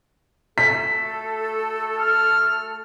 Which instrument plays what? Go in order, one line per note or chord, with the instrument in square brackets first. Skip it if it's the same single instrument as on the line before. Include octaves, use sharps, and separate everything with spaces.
[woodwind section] A3 F#4 A4 [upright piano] B6
[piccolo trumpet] F6